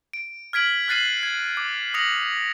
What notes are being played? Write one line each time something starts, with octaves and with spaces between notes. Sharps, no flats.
D7
F6 G#6 B6 D7 F#7
F6 F#6 A6 C7 D#7 F#7
G#6
D6
D#6 A#6 C#7 F7 F#7